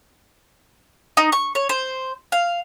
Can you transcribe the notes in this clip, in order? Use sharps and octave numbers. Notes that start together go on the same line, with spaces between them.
D#4
C#6
C#5
C5
F5